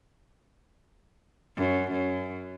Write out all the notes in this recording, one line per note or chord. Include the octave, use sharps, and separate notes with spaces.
F#2
F#2